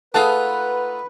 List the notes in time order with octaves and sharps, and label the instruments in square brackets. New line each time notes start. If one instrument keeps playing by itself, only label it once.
[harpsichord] A3 D#4 F4 [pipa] G#4 A5 [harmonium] B4 [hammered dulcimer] F#5